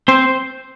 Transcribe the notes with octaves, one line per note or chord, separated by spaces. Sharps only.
C4 C5